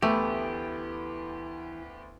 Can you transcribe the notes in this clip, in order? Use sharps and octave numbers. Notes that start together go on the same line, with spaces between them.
D2 E3 A3 B3 G4